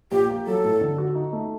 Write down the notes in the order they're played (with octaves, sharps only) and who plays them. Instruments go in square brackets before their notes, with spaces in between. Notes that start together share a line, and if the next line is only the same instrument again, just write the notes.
[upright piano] A#1 [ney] G4
[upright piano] A#3
[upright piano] F#3 [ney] A4
[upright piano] A2
D3
F#4
D#4
A3